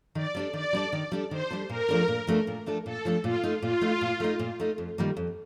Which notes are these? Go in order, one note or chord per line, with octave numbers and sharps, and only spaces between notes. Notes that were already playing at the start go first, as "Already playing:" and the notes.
D#3 D5
G3 D4 A4
D#3 D5
G3 D4 A4
D#3
G3 D4 A4
D#3 C5
G3 D4 A4
A#2 A#4
F3 A3 D4 A4
A#2
F3 A3 D4 A4
A#2
F3 A3 D4 A4
A#2 A4
F3 A3 D4 A4
A#2 F4
A3 D#4
A#2 F4
A3 D#4
A#2
A3 D#4
A#2
A3 D#4
F2
D#3 G3 A#3 F4
F2